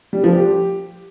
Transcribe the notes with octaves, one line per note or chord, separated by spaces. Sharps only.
G3
F3
G4